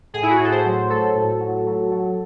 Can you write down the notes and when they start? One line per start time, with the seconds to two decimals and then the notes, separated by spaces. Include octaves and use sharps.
0.14 A2 G#4
0.23 E4
0.30 F#4
0.37 A2 G#4
0.44 A4
0.52 C5
0.65 F#3
0.90 F#3 A4
1.15 A2
1.40 F#3
1.66 F#3
1.91 F#3